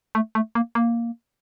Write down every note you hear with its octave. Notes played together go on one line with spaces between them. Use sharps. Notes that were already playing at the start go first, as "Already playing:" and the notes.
A3
A3
A#3
A#3